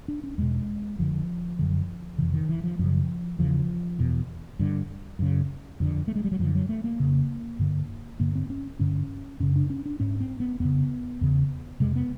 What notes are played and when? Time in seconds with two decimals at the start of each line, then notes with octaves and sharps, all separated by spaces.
0.08 D4
0.24 C#4
0.38 E2 B2 G#3
0.99 F2 D3 F3
1.59 F#2 D3
2.18 F2 C3 E3
2.34 D#3
2.49 E3
2.64 F3
2.79 F#2 C#3 F3
3.39 E2 C#3 F3
3.99 E2 B2
4.59 G2 D3
5.19 F#2 C#3
5.80 F2 D3
6.08 A3
6.16 G#3
6.24 G3
6.32 F#3
6.39 F#2 D3 F3
6.55 F#3
6.69 A3
6.84 A#3
7.00 F2 C#3
7.59 G2 D3
8.20 G2 D3 A#3
8.35 C4
8.50 C#4
8.79 G2 D3 C#4
9.40 F#2 C#3 C#4
9.56 D4
9.70 C#4
9.86 D4
10.00 G#2 C#4
10.20 C4
10.40 B3
10.60 F2 C#3 B3
11.21 E2 C#3
11.80 F2 C3 G#3
11.96 B3